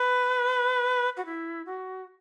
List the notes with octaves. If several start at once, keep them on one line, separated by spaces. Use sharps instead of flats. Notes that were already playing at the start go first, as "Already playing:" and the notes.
Already playing: B4
F#4
E4
F#4